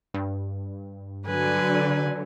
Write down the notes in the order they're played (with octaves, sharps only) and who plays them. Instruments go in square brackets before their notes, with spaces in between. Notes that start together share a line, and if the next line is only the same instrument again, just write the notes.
[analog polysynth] G2
[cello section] D3 [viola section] F#3 [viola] B4 G#5